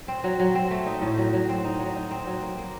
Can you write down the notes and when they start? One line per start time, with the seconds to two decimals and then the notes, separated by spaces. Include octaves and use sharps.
0.08 C4
0.24 F#3
0.40 F#3
0.55 C4
0.71 A3
0.86 D#4
1.02 A2
1.18 F#3
1.33 F#3
1.49 C4
1.64 D#4
1.80 F#3
1.95 D#4
2.11 C4
2.27 F#3
2.42 A#3
2.58 A#3